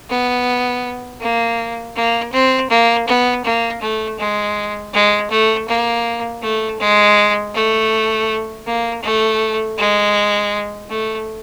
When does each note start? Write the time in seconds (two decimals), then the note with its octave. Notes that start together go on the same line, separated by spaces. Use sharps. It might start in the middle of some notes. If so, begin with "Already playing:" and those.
0.09 B3
1.20 A#3
1.95 A#3
2.33 C4
2.70 A#3
3.07 B3
3.44 A#3
3.81 A3
4.19 G#3
4.94 G#3
5.30 A3
5.68 A#3
6.42 A3
6.79 G#3
7.54 A3
8.66 A#3
9.03 A3
9.78 G#3
10.89 A3